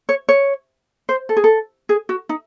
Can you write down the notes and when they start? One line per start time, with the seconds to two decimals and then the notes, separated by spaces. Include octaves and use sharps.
0.09 C#5
0.29 C#5
1.09 C5
1.29 A4
1.37 G#4
1.44 A4
1.89 G#4
2.09 F#4
2.29 D#4